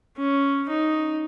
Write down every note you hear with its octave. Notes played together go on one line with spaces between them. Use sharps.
C#4
D#4